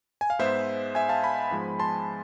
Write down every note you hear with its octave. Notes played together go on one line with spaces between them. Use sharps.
G#5
F5
G#2 G#3 B3 C5 E5
E5 G#5
F5 A5
G#5 B5
G#2 F3 G#3 B3
A5 C6